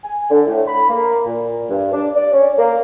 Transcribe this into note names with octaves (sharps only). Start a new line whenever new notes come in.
G#5
D3
A2
B5
A#3
A#2
G2
D4
D5
C#4
A#3